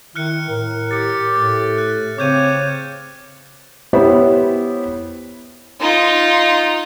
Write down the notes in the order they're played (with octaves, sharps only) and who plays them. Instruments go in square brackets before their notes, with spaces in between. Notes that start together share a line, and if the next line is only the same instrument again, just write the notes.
[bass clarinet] D#3 [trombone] E4 [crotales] F6 F#6 C#7
[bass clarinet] A2 [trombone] A#4
[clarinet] G4 [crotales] A6 C#7
[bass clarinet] A2 [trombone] A3 [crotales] A6
[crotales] F#6
[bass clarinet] C#3 [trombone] C4 [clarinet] C#5 [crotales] D6 G6 D#7
[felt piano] B3 E4 G4 C5 C#5
[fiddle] D#4 F4